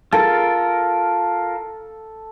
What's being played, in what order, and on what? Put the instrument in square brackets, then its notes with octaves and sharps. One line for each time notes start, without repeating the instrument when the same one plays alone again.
[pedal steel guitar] F4 A#4 A5 [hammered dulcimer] A4